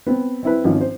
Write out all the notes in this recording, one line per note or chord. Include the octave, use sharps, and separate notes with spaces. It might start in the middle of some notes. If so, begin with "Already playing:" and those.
B3 C4
C4 E4 B4
G#1 D#3 F3 C#4
C5